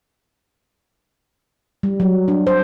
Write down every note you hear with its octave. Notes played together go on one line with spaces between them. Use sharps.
G3
F#3
D4
C5